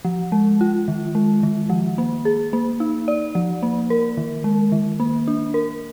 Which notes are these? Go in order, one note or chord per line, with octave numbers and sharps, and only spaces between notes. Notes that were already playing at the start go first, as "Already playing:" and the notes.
F3
G#3
F4
D#3
G#3
D#3
F3
A#3
G#4
A#3
D#4
D5
F3
A#3
A#4
D#3
G#3
D#3
A#3
D4
A#4